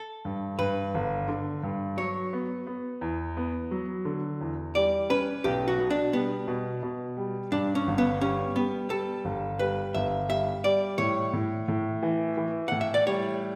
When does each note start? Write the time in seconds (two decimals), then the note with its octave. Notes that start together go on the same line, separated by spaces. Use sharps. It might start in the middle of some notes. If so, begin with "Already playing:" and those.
Already playing: A4
0.25 G2
0.59 G2 B4
0.94 G1
1.28 D3
1.63 G2
1.97 F#3 C#5
2.33 B3
2.67 B3
3.01 E2
3.37 B3
3.71 F#3
4.05 D3
4.41 E2
4.75 G3 D5
5.10 C#4 B4
5.44 B1 G4
5.68 F#4
5.79 B2
5.91 D4
6.13 G3 B3
6.48 B2
6.83 B2
7.17 G3
7.52 G2 D4
7.75 C#4
7.87 G1
7.98 B3
8.21 G3 C#4
8.56 G3 B3
8.90 G3 A4
9.25 G1
9.59 G3 B4
9.94 G1 E5
10.29 G3 E5
10.64 G3 D5
10.98 A2 C#5
11.33 A2
11.68 A2
12.03 E3
12.37 E3
12.68 A2 F#5
12.81 E5
12.94 D5
13.06 G3 C#5